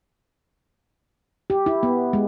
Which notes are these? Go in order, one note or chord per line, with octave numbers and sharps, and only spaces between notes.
G4
E4
B3
G#3